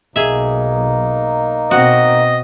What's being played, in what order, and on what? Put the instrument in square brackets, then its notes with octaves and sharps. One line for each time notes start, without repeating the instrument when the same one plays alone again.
[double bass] B1 [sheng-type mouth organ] A#3 D#4 [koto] G#4 E5
[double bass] B2 C4 [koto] F#4 [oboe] D#5